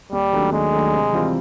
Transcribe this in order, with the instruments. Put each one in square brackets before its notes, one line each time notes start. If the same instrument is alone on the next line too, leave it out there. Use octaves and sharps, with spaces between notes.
[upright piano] D#2 [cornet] G3
[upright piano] D#3 F#3 A3 D4
[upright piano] D#2 [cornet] G#3
[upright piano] D#3 F#3 A3 D4
C3
E3 G3 C4 F4